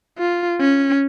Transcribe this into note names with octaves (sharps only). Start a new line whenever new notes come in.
F4
C#4